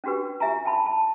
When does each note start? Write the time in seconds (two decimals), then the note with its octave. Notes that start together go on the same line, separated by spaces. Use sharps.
0.04 C#4 D4 F#4 G4 B4
0.40 F4 G4 E5 G#5 A#5
0.65 G5 A5 B5
0.86 A5